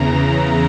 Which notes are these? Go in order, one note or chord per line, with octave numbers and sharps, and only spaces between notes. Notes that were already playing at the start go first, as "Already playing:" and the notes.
Already playing: E2 C#3 E3 A#5